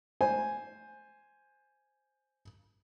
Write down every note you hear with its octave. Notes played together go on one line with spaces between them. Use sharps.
C5 G#5